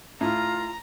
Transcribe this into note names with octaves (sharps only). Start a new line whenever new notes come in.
A2 F4 A#5